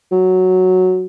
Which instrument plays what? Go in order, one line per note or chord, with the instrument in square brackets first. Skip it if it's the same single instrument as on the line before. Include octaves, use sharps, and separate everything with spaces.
[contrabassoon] F#3